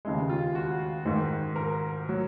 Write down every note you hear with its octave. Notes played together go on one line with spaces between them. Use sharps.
D#2 C#3 G#3
F4
F#4
G#2 D#3 G#3
A#4
F#3